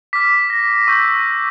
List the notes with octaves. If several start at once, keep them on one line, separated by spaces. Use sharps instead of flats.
D6 F6 B6
A#6
C#6 E6 G6